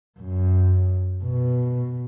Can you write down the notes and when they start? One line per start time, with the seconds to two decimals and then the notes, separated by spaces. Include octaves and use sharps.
0.19 F#2
1.23 B2